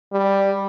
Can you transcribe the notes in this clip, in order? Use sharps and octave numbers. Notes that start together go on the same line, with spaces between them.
G3